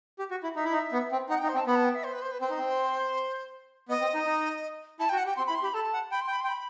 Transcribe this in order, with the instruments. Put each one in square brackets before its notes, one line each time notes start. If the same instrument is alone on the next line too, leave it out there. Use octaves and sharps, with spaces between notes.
[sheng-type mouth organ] G4
F#4
E4
[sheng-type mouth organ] D#4 [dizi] E5
[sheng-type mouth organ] E4
D#4
B3
C4
[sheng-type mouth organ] D#4 [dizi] F#5
[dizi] G5
[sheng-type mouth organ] D#4
[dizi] C5
[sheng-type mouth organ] C4
[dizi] A5
[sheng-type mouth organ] B3 [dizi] B5
[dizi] A5
G5
E5
C5
B4
C5
B4
[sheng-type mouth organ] C4 [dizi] C5
[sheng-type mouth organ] D#4
C4
[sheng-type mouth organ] B3 [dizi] D#5
[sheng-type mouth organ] C4
D#4
D#4
[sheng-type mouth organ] E4 [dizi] A5
[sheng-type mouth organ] F#4 [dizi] G5
[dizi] F#5
[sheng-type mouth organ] G4 [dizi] G5
[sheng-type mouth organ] C4 [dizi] C6
[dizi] B5
[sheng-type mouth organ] E4
[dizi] C6
[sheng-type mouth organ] G4 [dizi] B5
[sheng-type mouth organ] A4 [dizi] A5
[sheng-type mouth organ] F#5
[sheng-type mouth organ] G5 [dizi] B5
[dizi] C6
[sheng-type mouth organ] G5 [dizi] B5
[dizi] C6
[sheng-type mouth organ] G5
[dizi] B5